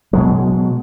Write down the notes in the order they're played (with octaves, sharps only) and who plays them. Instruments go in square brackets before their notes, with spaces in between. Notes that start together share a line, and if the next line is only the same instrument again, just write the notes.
[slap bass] B2 F#3 G#3